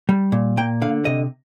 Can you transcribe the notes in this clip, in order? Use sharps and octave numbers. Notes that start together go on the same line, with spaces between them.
G3
A#2
A#3 G5
D3 F5
C3 D#5